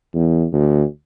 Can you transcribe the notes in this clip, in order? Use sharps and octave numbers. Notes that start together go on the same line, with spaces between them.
E2
D2